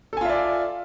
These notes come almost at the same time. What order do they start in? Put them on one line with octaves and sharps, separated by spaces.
A4 G#5 F4 E5 D5